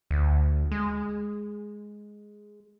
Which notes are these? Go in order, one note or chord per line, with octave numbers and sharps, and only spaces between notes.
D2
G#3